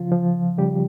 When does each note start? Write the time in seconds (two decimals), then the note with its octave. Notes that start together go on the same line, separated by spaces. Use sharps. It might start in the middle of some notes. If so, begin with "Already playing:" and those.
Already playing: C#3 F3 F4
0.11 F3
0.58 C#3 G3 G4